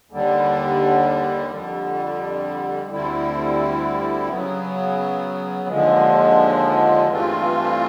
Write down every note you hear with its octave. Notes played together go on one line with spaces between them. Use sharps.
D#2 D3 G3
F2 D3 G3
D2 D3 G3 C4 E4
C#3 F#3 B3
D#2 D3 F3 G#3
G2 E3 A3 C4 F4